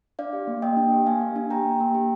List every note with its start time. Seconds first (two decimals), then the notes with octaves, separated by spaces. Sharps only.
0.19 D4 D5 F5
0.33 G4
0.47 A#3
0.62 A#3 D#5 G5
0.77 D4
0.92 G4
1.07 A#3 F5 G#5
1.21 A#3
1.36 D4
1.50 G4 G5 A#5
1.65 A#3
1.80 A#3
1.95 G4